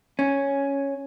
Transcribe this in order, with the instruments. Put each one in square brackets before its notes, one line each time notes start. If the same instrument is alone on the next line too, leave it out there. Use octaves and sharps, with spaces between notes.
[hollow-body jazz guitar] C#4